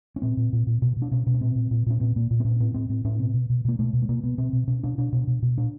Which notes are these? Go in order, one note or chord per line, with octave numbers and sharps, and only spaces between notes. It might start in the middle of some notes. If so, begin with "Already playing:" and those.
C#4
A#2 C4
A#2
A#2
A#2
B2
B2
D4
B2 C#4
B2
C#4
A#2 C4
A#2
A#2
A#2 C#4
A#2 C4
A#2 A#3
A#2
C4
A#2 C#4
A2 C4
A2 C4
A2 C4
A2 C#4
B2 C4
B2
B2
B2 A#3
B2 A3
B2
A3
B2 A#3
B2 B3
B2 C4
B2
B2 C#4
B2 D4
B2 D4
B2
B2
B2
A#2 D4